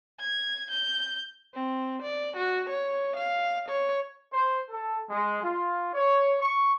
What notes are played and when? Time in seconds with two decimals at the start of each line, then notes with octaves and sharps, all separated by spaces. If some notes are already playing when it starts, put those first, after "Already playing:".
0.20 G#6
0.70 G6
1.54 C4
2.02 D5
2.37 F#4
2.70 C#5
3.16 F5
3.69 C#5
4.33 C5
4.69 A4
5.09 G#3
5.43 F4
5.94 C#5
6.42 C#6